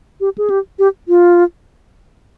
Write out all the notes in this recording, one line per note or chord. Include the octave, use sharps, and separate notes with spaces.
G4
G#4
G4
G4
F4